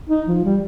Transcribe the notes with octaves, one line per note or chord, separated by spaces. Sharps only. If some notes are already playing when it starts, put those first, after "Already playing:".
D#4
F3
G3